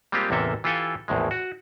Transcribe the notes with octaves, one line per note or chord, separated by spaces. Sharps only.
G3 G#3 A#3 C4 F4 G4
A1 E2 C3 A#3 A4 E5
E3 F4 G4 A4 F5 G#5
A#1 E2 A2 G#3
F#4